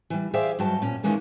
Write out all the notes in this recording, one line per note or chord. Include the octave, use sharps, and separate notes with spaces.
E3 G3
G#4 C5 D5 E5 F5 G5
G2 F#3 G5 A5
A#2 C#4
D#3 E3 G#3 A#3 C#4